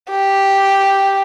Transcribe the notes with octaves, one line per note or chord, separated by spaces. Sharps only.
G4